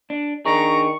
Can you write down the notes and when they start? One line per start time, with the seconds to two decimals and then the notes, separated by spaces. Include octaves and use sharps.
0.10 D4
0.45 D#3 D4 G#4 A#5 C#6